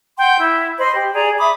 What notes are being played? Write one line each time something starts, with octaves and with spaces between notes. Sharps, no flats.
F#5 G5 C6 G6
E4
C5 D#5 B5
G4
G#4 D5 A#5
E5 B5 D6 D#6